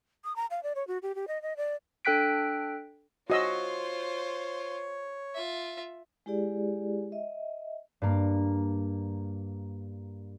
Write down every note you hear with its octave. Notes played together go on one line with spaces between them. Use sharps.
D#6
A#5
F5
D5
C#5
F#4
G4
G4
D#5
D#5
D5
D4 A4 G5 F#6 B6 D7
F4 F#4 C5 C#5 D#5 E6
F4 E5
G#3 E4 G4 G#4 D5
D#5 E5
G2 A#3